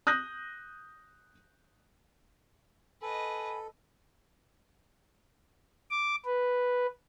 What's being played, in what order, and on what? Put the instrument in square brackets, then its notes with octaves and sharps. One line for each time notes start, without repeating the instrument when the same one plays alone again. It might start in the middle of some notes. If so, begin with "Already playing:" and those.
[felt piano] D#6 F#6 G6 A#6
[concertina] A4 [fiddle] B4 D#5 [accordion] G#5 B5
[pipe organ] D6
B4